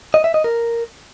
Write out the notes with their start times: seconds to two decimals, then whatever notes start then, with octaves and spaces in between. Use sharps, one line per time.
0.14 D#5
0.24 E5
0.34 D#5
0.44 A#4